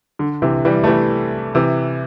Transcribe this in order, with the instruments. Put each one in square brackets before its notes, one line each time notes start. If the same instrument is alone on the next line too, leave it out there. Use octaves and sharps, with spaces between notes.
[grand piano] D3
C3 E3
E3 G3
A3
E3 G3
C3 E3